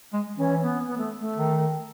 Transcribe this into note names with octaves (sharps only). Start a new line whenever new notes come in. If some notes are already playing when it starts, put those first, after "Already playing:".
G#3
E3 C#4
B3
B3
A3
A3
D#3